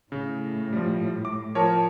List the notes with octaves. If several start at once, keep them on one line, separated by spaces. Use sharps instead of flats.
A2 C#3
F3 G3
D6
F3 A#4 C#5 A5